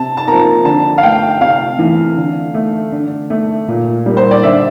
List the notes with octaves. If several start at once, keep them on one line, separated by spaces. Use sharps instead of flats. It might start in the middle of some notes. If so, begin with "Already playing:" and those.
Already playing: C3 A5
A5
F3 A#3 A#5
D3 A5
F5
A3 G5
C3 F5
E3 A3
D3
A3
D3
A3
A#2
G3 A#3
C5
D5
D3 E5